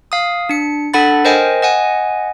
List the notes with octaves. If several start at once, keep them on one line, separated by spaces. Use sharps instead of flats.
F5 D#6
D4 C#7
D4 A4 F#5 B5 A6
A#4 C5 D#5 G5 G#5
D#5 F#5 G#5